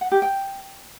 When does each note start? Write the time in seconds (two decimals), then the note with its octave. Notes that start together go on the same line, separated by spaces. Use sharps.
0.01 F#5
0.12 G4
0.22 G5